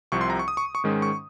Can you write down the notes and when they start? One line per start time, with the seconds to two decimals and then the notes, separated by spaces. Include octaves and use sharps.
0.12 C2 C3 F3 C4 C#6
0.21 C6
0.30 A#5
0.39 C#6
0.48 D#6
0.57 C#6
0.75 C#6
0.84 G#2 D#3 G#3 C#4
1.02 C#6